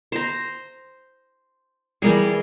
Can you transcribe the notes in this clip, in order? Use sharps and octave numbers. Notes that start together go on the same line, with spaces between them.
C5 A#5
E3 G3 G#4 A#4 G#5